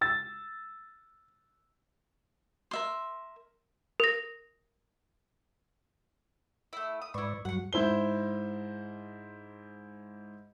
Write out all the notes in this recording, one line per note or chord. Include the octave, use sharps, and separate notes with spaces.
E6 A6
A#4 E5 C6
A#4 A#6
A3 E4
D#6
G#2 E4 B4 D5 C#6
G2 F#3 F#5 C#6
G#2 E4 C5 G7